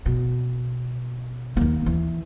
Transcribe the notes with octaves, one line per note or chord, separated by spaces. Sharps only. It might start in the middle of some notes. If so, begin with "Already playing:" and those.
B2
D#2 A#3
E3